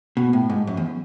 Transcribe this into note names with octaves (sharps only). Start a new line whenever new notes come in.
B2
A2
G#2
F#2
E2